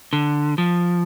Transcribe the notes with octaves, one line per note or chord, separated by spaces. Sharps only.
D3
F3